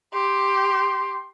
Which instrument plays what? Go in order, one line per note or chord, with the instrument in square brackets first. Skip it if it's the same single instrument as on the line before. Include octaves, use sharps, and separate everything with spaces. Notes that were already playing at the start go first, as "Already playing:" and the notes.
[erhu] G4 [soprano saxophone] C6